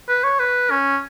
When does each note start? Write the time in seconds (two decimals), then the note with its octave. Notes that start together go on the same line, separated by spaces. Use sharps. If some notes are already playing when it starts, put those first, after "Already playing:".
0.09 B4
0.24 C#5
0.40 B4
0.71 C#4